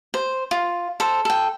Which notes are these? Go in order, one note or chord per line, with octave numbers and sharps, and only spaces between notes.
C5
F4
A4 C5
A4 G5